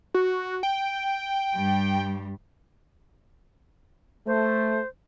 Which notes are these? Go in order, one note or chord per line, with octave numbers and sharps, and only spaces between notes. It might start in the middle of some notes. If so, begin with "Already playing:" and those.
F#4
G5
G2 G3
A3 C5